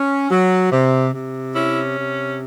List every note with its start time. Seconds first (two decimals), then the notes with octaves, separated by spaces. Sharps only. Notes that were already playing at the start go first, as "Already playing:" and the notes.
Already playing: C#4
0.29 F#3
0.71 C3
1.12 C3
1.53 C#4 E4
1.95 C3